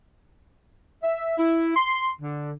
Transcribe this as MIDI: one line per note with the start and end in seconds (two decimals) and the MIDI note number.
1.03 1.35 76
1.37 1.74 64
1.76 2.10 84
2.21 2.52 50